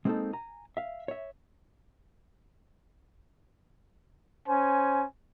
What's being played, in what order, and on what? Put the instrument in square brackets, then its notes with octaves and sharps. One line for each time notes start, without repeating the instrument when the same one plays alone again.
[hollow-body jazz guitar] G#3 A#3 C4 D4 D#4 A4
G#5 A#5
E5 F5
C#5 E5
[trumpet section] C#4 C5 G#5